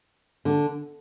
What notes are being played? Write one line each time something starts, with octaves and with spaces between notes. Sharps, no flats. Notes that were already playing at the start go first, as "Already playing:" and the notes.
D3